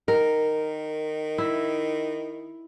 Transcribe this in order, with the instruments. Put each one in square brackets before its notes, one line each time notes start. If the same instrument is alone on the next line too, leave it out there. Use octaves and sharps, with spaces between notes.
[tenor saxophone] D#3 [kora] A#4
[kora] E4